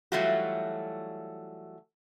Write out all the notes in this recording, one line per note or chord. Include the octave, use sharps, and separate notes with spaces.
E3 F#3 G3 A3 F4 F#4